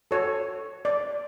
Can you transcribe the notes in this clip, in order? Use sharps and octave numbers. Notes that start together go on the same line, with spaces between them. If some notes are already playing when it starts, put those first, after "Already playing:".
F#4 A4 C#5
D5